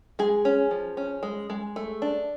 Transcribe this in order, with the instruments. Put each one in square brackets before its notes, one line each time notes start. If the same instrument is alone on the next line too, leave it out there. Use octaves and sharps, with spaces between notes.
[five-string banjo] G#3 G#4
C#4
F3
C#4
G#3
G#3
A3
D4